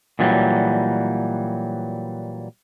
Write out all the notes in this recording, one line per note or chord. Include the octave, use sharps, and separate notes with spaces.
A#2 E3 F#3 G3